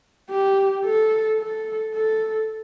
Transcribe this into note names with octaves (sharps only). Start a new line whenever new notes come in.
G4
A4
A4
A4